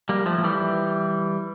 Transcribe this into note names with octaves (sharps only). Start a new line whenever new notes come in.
G3 A#3
F3 A3
F3
E3 G3